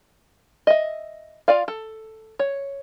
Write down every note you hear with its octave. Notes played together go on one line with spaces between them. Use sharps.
D#5 E5
F4 D5 F5
A4
C#5